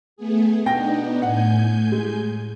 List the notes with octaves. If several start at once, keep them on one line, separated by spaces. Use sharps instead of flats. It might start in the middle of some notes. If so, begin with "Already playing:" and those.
A3 B3 G#4
B2 B3 D4 D#4 G5 A#6
A2 F#5 G#5 G6
G#3